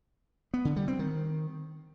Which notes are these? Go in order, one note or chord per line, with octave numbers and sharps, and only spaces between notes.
B3
D3
G3
C4
D#3